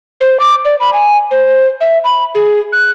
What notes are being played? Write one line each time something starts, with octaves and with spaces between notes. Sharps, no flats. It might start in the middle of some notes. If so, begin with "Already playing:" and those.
C5
D6
D5
B5
G#5
C5
E5
B5
G#4
F#6